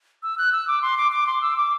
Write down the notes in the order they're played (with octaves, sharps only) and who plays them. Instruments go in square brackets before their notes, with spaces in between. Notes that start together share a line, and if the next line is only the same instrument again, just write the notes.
[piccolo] E6
F#6
E6
D6
C6
D6
D6
C6
E6
D6